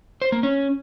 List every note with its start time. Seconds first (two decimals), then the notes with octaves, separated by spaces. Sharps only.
0.22 C5
0.32 A#3
0.43 C#4